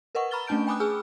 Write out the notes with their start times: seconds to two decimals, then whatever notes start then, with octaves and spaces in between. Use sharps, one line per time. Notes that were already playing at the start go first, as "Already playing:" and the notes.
0.15 A#4 B4 D#5 F#5 C#6
0.31 A#5 B5 C#6 F6 A6 G7
0.47 A3 C#4 D4 A5 G6 D7
0.67 G5 G#5 B5 D6 D#6 F#6
0.80 G#4 G#5 E6 F6